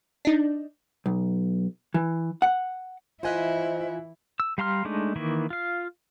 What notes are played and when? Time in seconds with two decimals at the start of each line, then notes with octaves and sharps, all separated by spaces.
0.25 D4 D#4
1.06 B1
1.94 E3
2.42 F#5
3.23 E3 E4 F4 C5 D#5 E5 G#5 F#6
4.40 E6
4.58 G3 F5 A#5 C6 F6
4.85 G#3 A3 D4 D#4
5.16 D#3 E3 A#3 E4
5.50 F4 F5